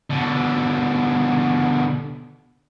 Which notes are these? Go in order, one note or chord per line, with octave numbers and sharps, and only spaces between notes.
B2 D3